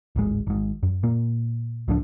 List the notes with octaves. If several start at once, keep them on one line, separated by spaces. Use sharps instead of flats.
D1 G#1 G#3
G#1 G#2
F#2
A#2 A#3
C#2 A2 F3 D4